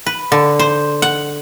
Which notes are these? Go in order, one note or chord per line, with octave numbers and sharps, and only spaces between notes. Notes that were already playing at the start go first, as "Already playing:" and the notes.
B4
D3
C5
F#5